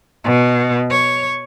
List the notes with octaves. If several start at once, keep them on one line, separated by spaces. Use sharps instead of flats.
B2
C#5